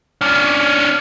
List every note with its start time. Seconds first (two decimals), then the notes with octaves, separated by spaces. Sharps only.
0.21 C#4 D4